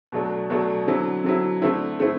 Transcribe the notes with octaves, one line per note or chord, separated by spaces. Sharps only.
B2 F#3 A3 D4
B2 F#3 A3 D4
D3 F#3 C4 E4
D3 F#3 C4 E4
D3 A3 C4 E4
D3 A3 C4 E4